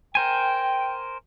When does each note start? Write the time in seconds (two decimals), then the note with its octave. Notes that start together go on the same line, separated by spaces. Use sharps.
0.15 A#4 C5 G5 G#5